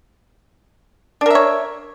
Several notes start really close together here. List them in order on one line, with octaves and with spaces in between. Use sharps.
D4 A#4 E5 C#5